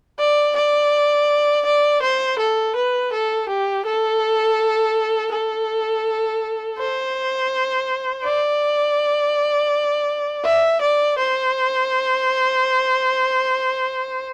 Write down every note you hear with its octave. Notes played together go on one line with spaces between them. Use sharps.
D5
D5
D5
C5
A4
B4
A4
G4
A4
A4
C5
D5
E5
D5
C5